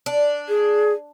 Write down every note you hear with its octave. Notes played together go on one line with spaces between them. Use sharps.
D4
G#4